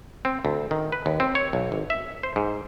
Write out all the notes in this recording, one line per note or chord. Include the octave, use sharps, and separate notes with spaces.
C4
D2
D#3
B4
D#2
C4
C#5
B1
G#1
E5
C5
G#2